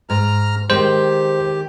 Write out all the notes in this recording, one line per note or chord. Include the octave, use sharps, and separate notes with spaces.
G#2 A#5 F6
D#3 G#3 G4 C5